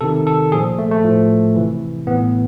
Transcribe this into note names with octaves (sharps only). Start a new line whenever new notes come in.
C3 D#3 A4
A4
A#2 F3 G#4
A3
A3
A2 F3
C3 E3
A2 E3 B3